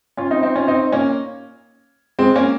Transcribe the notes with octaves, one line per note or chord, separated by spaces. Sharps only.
C#4 F4
C4 D#4
C4 D#4
C#4 F4
C4 D#4
A#3 C#4
G#3 C4
A#3 C#4